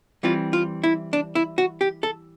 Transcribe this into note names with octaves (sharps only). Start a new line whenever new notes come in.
E3 G3 C4 F4
F4
E4
D4
E4
F#4
G4
A4